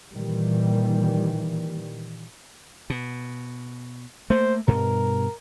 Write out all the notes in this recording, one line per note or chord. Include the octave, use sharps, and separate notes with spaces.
A#2 D#3 E3 G3
B2
A3 A#3 C5
G2 B2 A#4